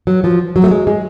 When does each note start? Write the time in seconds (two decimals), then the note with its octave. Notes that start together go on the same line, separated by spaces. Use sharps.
0.07 F#3
0.24 F3
0.56 F#3
0.64 A3
0.71 G#3
0.87 G#3